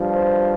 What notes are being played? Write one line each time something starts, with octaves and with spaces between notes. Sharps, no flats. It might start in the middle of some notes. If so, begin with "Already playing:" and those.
Already playing: G2 F3
C5